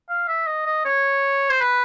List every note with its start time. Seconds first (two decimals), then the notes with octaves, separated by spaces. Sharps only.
0.10 F5
0.28 E5
0.47 D#5
0.66 D#5
0.85 C#5
1.50 C5
1.61 B4